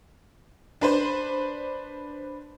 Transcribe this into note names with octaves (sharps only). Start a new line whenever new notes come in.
D4 B4 C5